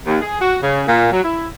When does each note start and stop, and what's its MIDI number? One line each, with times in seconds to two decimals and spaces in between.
0.06 0.19 39
0.22 0.41 68
0.41 0.58 66
0.63 0.83 49
0.87 1.11 46
1.12 1.23 54
1.24 1.47 64